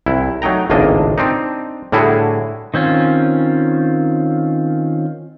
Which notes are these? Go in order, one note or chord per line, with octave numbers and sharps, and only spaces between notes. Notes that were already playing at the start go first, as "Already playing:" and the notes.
C2 E4
F#3 A3 D#4 G5 A#5
G#1 C#2 A2 A#3 D4 D#5
C4 D4 D#4
A2 D3 G3 E4 F#4 G#4
D#3 C4 C#4 F4